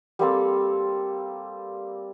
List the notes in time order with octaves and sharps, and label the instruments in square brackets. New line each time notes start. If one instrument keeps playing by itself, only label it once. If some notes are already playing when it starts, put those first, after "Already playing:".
[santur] G3 A#3 C4 A4